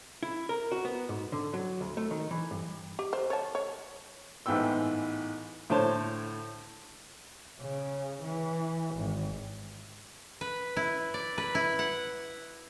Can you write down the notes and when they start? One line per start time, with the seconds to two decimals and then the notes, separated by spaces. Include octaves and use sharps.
0.23 E4
0.49 A#4
0.72 F#4
0.85 B3
1.09 G#2
1.32 D3
1.54 F#3
1.81 D2
1.97 A3
2.11 D#3
2.31 E3
2.51 G2
2.99 G4
3.13 C5
3.30 C#5 A5
3.55 C#5
4.46 A1 G#2 B3 G5 E6
5.70 A2 D3 C5 C#5 A5
7.61 C#3
8.23 E3
8.96 G#1
10.41 B4
10.76 E4
11.14 D5
11.38 B4
11.55 E4
11.79 F#5